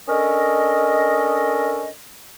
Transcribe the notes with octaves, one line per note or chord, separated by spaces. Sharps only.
C#4 D4 A4 A#4 D#5